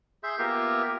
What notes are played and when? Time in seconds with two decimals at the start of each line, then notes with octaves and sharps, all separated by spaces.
0.23 G#4 E5 C6 G6
0.39 A#3 B3 F4 G4 A#4 E5